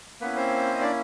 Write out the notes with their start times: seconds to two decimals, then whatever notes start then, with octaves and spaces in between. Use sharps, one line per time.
0.21 A#3 B3 C#4 E4 B4
0.37 C4 C5
0.74 D#5
0.81 D4 D5